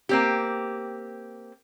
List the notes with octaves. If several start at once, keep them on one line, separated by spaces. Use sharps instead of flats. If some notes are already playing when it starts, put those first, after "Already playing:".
A#3 C4 G4